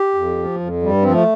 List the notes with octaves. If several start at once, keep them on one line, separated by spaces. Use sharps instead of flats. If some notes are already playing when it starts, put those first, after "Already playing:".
Already playing: G4
F2
F3
F2
G2 G3
F3 C4
A3